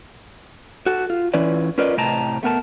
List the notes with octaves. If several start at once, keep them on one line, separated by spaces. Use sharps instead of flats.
F#4 A4
F4
E3 C#4 E4 F4 B4 D5
C#4 F4 A#4 B4 D5 D#5
A2 C3 D#5 G5 A5 A#5
A3 B3 A#4 A5